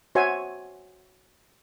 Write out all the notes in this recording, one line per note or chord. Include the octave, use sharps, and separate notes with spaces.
F#4 C5 C#5 E5 G#5